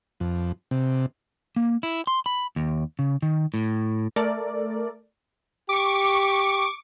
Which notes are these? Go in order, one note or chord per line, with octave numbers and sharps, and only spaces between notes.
F2
C3
A#3
E4
C6
B5
D#2
C#3
D#3
A2
A3 A4 A#4 D5
G4 C#6 D6